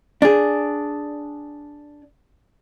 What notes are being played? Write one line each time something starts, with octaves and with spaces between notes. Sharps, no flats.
D4 G#4